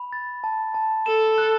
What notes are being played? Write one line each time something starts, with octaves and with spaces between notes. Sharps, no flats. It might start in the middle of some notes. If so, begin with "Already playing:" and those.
Already playing: B5
A6
A5
A5
A4 E7
F#6